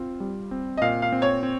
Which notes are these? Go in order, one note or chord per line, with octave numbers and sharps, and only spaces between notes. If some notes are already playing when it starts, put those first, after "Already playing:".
Already playing: C4 F4
G3
C4
D#5
A#2 F5
F5
C4
C#5
C4